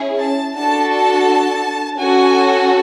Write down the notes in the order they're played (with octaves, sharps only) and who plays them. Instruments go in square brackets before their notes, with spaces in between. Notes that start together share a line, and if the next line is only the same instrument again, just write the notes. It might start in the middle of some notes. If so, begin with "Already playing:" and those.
Already playing: [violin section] C#4 E4 G#4
A5
D4 F#4 A4 A5
A5
C#4 F#4 A4 G#5